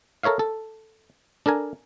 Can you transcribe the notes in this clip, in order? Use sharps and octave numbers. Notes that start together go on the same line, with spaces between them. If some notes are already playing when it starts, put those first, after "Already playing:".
A4 A#4 C#5 E5 F5
A4
D4 A4 A#4 G#5